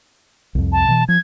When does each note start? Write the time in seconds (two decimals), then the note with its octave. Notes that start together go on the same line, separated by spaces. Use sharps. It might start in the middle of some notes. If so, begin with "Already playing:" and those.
0.55 C2 F2
0.72 A5
0.88 B2 E3
1.08 F3 G#6